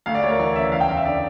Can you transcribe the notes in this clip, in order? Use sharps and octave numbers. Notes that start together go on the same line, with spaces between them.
D2 F5
D5
D2 C#5
A#4
E3 D5
C#3 E5
E2 F5
G5
E2 F5
E5
D3 D5